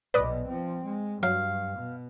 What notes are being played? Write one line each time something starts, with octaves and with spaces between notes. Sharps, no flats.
B1 B2 B4 D5 D#5
F3 C4
G#3
G2 F#3 F5
B2